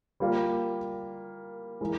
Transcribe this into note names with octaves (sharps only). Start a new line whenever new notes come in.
G3 A#3 F4
E3 G#3 E4 A#4